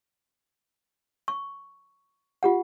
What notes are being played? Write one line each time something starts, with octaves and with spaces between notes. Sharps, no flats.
C#6
F4 G4 F#5